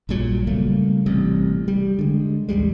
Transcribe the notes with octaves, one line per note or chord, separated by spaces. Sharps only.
A#1 G2 A#2 F#3
C#3 G3 A3 A#3
A1 C3 G3
G3
D3 G#3
A1 D#2 G3 G#3